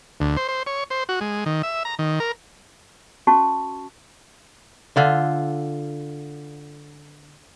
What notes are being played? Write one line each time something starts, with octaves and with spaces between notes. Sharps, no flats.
D2
C5
C5
C#5
C5
F#4
G#3
D#3
E5
A#5
D#3
A#4
C#4 F#4 A5 C#6
D3 F4 E5